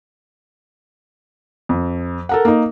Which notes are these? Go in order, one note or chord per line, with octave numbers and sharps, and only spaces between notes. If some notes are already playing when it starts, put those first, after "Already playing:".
F2
A4 A#4 F#5
A#3 D#4